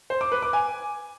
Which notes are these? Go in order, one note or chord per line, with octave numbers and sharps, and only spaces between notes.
C5
D6
B4
D6
G#5